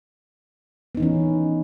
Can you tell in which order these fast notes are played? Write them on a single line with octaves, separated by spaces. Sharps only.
B3 D#4 E3 C#4